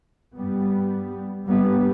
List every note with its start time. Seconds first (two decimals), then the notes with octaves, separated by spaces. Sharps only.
0.36 G2 G3 B3
1.48 G2 G3 B3